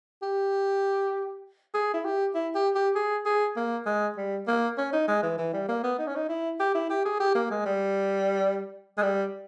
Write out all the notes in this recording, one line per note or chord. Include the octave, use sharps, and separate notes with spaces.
G4
G#4
E4
G4
E4
G4
G4
G#4
G#4
A#3
G#3
G3
A#3
C#4
D#4
G#3
E3
E3
G3
A#3
B3
D#4
C#4
D#4
E4
G4
E4
G4
G#4
G4
A#3
G#3
G3
G#3
G3